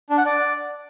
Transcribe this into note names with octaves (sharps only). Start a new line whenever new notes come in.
D4
F#5
D5